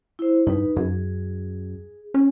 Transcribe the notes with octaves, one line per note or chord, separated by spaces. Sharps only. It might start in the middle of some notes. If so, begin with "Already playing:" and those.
E4 C5
G2 D#4 B4
F#2 G#4
C#4